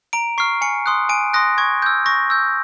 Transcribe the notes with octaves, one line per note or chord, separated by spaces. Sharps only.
A#5 D7
C#6 F6 C7
G#5 C#7
C6 D#6 F#6
G#5 D7
C6 D#6 F#6 A#6
C#6 G#6
E6 G6
C#6 A#6
E6 G6